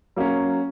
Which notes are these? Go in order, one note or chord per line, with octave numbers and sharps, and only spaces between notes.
F#3 A#3 C#4